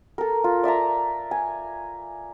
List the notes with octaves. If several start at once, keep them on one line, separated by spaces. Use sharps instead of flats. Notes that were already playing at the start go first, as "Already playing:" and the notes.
A4 A#4
F4
D5 E5 A5 A#5
G#5